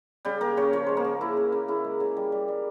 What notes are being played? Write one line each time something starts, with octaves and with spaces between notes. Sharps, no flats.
C#3 G3 G4
C#3 A#3 A#4
C#3 C#4 C#5
F3 C#4 C#5
G#3 C5
A#3 A#4
C#3
C#3 E4
C#3
C#3
C#3 E4
G#3
C#3
G3
G3
G3